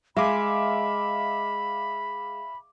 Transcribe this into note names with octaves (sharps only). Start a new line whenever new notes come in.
G#3 E5 F5 B5 D6